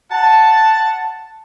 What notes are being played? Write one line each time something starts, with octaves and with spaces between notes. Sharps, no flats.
F#5 A5